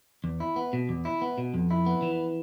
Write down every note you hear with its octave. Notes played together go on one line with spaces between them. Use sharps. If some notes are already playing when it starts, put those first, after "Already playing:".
E2
E4
B3
B2
E2
E4
B3
B2
F2
E4
B3
E3